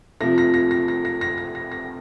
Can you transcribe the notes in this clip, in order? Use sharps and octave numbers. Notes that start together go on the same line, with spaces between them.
C3 F3 A3 A#6
A#6
A#6
A#6
A#6
A#6
A#6
A#6
A#6
A#6